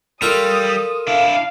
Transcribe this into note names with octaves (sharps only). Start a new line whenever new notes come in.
G3 F4 A4 A#4 D#6
D4 E4 F5